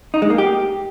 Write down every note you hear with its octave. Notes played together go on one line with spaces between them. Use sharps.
D#4
G#3
A#3
G4